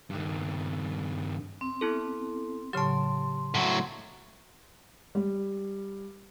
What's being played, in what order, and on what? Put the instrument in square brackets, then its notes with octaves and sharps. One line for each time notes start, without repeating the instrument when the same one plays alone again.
[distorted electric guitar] G2 D#3
[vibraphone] C4
[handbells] B3 E4 A4
[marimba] A2 C#3 F#3 [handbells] G4 A5 [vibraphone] C6
[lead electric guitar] A2 F#3 [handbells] F#5
[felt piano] G3